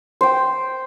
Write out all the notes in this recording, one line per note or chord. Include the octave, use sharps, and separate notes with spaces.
C5 G5